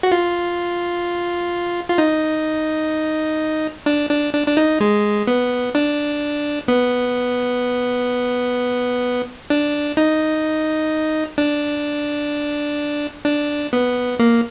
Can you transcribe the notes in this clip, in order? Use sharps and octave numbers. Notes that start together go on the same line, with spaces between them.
F#4
F4
F4
D#4
D4
D4
D4
D4
D#4
G#3
B3
D4
B3
D4
D#4
D4
D4
B3
A#3